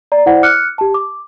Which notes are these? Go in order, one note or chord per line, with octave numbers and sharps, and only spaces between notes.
D5 A#5
E4 C5 D5 F#5
D6 F6 F#6 C#7
G4 A5
D6